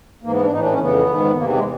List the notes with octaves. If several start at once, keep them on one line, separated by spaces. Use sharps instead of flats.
G#2 E3 A#3
B3
D4
A2 E3 D#4
D4
C#4
F2 C#3 E3 B3
G#2 D#3
E2 C3 E3 A#3
G#3